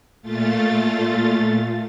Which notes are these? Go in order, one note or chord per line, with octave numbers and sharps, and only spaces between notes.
A#2 A3 F4 A6